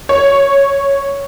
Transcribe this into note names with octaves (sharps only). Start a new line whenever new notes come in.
C#5